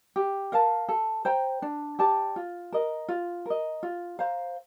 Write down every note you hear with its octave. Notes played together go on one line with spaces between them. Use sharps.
G4
A#4 F5 A5
A4
C5 G5 A#5
D4
G4 D5 A5
F4
A#4 D#5
F4
A#4 D#5
F4
C5 F5 A#5